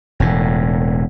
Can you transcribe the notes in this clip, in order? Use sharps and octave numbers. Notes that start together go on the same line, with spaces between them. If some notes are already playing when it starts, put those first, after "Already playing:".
E1 A2